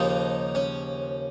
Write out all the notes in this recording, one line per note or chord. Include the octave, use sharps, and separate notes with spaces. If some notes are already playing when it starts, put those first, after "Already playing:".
Already playing: D#2 C#3 F3 A#3 D#4
C#4